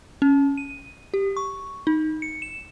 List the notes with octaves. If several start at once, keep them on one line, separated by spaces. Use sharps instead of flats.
C#4
D#7
G4
C#6
D#4
C#7
E7